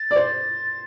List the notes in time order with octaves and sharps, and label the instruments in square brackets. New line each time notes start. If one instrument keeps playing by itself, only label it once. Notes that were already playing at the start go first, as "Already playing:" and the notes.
Already playing: [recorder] A6
[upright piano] D5
C5